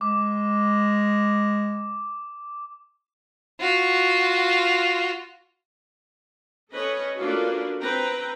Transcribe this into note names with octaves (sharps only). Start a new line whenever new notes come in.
G#3 D6
F4 F#4
C#4 A4 B4 C#5 D#5
A#3 D4 F4 F#4 A4 B4
C4 B4 G5 A#5